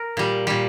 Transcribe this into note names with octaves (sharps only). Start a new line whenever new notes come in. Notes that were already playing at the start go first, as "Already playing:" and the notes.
Already playing: A#4
A#2 G3
A#2 G3